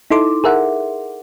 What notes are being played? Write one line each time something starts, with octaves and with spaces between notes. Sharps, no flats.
D#4 E4 A4 C6 D6
G#4 A#4 E5 F#5